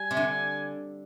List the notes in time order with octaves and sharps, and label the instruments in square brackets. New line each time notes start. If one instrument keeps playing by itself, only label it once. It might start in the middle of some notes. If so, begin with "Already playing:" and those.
Already playing: [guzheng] G3 [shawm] G#5
[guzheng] C3
D3